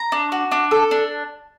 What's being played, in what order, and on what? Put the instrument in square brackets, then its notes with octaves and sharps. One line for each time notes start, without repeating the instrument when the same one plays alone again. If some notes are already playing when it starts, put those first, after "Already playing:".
Already playing: [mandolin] A#5
D4
F#4
D4
A4
D4